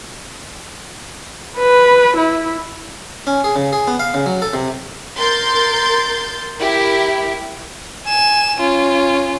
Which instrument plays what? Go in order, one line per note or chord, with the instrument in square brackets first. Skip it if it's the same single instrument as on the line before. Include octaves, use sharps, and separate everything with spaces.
[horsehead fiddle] B4
E4
[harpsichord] C#4
G#4
C#3
G#4
B3
F5
C#3
F#3
A4
C3
[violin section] A#4 C6 G6 A6
E4 G4 A#4
[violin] G#5 E7
C#4 F4